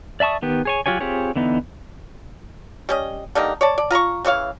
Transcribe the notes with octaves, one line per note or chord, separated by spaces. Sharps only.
D5 E5 A5 C#6 D#6
D#3 B3 G4
G#4 C#5 G#5
F#3 F4 G4 C#5 G#5
C4 F4 G4 G#4 C#5
D3 E3 B3 D#4
G3 C#4 D#5
D3 G3 A#3 D#4
C#5 D5 A5
D5
F4 A#5 C6 C#6
C#3 E3 C#5 F5